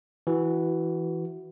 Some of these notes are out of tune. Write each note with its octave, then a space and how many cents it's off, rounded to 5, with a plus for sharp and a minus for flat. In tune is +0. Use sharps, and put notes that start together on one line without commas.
E3 +0 F#4 +15